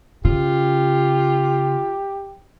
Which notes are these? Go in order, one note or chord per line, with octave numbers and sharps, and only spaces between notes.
C#3 F4 G4